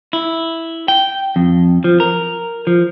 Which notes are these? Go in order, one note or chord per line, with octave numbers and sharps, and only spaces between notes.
E4
G5
F2
F3
A#4
F3